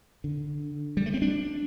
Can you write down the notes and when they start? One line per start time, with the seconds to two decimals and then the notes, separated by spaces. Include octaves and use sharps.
0.24 D3
0.97 G3
1.06 A3
1.14 C4
1.22 D4